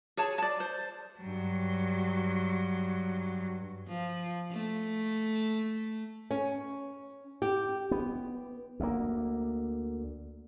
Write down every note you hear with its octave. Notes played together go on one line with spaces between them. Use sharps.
G#4 C#5 A5
D5 A5
C5
G2 F#3
F3
A3
C#4
G4
B3
D2 A#3